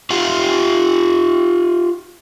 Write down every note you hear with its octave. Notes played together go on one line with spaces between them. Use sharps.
F4 G4 F5 F#5